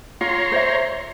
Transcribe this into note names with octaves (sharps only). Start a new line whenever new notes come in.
F4 C#5 A#5 C6
C5 D5 E5